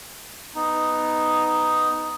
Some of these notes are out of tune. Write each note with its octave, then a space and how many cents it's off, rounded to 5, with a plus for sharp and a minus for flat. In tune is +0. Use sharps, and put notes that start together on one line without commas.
B3 +15 D#4 +0